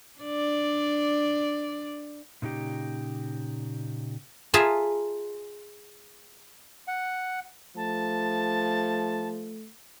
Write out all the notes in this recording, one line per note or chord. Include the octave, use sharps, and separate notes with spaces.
D4 D5
A#2 C#3 D#4 G4
F4 G#4 E5 A5 A#5
F#5
F3 A3 A5